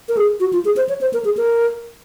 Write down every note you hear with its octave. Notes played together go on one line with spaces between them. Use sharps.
A#4
G#4
F#4
F4
G#4
C5
C#5
C5
A#4
G#4
A#4